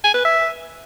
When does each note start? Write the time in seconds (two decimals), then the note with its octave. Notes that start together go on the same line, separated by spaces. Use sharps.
0.04 G#5
0.14 B4
0.25 E5